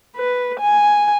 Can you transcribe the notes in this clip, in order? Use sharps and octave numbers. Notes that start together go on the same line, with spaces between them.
B4
G#5